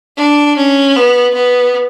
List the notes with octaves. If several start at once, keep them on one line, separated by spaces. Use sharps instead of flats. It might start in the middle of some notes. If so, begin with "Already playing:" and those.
D4
C#4
B3
B3